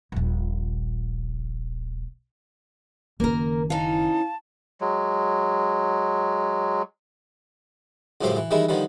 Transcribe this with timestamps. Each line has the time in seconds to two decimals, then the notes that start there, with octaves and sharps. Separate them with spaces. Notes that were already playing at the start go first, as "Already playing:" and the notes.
0.12 D#1 A#1
3.20 F#1 D#3 A#3 A#4
3.70 E3 C#4 D#4 F5 A5
4.81 F#3 G#3
8.21 C#2 F#2 A2 F3 G4 C5
8.37 E3
8.51 D#3 E3 G3 G#3 E4
8.69 D3 D#3 F3 G3